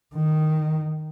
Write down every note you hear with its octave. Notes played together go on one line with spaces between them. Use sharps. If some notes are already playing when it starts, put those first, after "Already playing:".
D#3